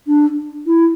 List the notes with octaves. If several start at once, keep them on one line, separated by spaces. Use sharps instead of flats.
D4
E4